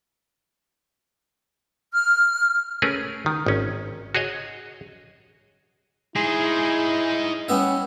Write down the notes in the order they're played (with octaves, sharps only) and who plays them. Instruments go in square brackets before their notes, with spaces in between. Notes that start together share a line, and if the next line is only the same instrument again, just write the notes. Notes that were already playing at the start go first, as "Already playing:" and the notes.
[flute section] F6
[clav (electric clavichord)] A3 C#4 G#4 A#4 B4
D#3
G#1 C#4
F#4 G#4 C#5 D#5
[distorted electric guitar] D#4 C5 [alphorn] E4 [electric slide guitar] G#4
[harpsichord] G3 B3 E5 [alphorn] C#4